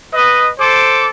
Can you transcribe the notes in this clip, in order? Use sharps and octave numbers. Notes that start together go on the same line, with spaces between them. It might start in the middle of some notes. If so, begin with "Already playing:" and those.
B4 D#5
A4 C5 D6